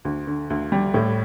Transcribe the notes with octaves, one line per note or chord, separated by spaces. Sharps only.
D2
D3
D2
G3
A2